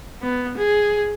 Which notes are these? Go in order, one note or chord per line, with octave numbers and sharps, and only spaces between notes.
B3
G#4